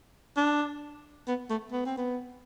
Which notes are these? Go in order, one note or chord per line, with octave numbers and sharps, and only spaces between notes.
D4
B3
A3
B3
C4
B3